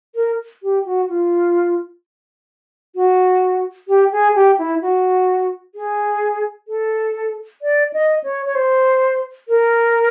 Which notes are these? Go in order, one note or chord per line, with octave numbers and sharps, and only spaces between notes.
A#4
G4
F#4
F4
F#4
G4
G#4
G4
E4
F#4
G#4
A4
D5
D#5
C#5
C#5
C5
A#4